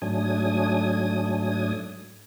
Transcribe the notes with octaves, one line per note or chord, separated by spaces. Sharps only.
G#2 F#3 A3 D4 G#5 D#6